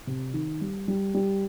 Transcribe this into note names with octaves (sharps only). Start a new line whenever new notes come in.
C3
D#3
G3
G3
G3